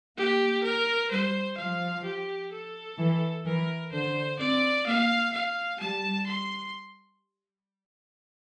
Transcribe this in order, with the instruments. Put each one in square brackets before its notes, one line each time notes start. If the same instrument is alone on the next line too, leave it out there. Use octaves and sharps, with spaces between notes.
[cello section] A#3 [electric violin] G4
[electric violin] A#4
[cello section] G3 [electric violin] C5
[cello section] F3 [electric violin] F5
[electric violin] G4
A4
[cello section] E3
[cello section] E3 [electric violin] A#4
[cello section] D3 [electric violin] C5
[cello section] C4 [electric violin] D5
[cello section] A#3 [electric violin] F5
[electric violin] F5
[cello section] G3 [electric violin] A5
[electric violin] C6